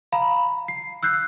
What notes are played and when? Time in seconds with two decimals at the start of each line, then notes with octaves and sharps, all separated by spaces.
0.12 F5 A#5 B5
0.68 C7
1.03 E6 F#6 G6 C7